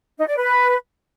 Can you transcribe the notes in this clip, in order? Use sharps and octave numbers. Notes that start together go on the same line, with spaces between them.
D#4
D5
B4